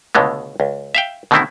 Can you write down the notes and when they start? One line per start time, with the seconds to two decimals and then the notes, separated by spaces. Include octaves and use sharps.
0.15 C#2 B2 D3 G#3 A3
0.60 C#2
0.95 E5 F5 G5
1.31 B2 D3 D#3 A3 C4 E4